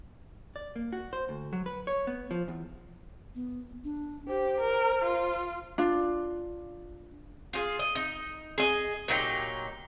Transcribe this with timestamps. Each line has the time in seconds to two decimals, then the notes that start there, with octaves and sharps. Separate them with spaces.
0.56 D5
0.76 A#3
0.93 F#4
1.13 C5
1.29 D2
1.53 F#3
1.66 B4
1.87 C#5
2.07 B3
2.31 F3
2.48 E2
3.35 B3
3.84 D4
4.28 G4 C5
4.60 A#4
5.04 F4
5.78 D4 F4
7.53 F4 G#4
7.79 D#5
7.95 D#4
8.58 G#4 D#5
9.08 A#2 F#3 D#4 G4